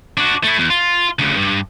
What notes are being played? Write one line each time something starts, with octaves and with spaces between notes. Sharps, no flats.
D4 F#4
A3 E4
E2
F4
D2 C#3
G2